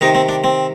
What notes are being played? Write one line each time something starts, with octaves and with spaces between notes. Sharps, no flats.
C3 D#3 D#4
C4
D4
C4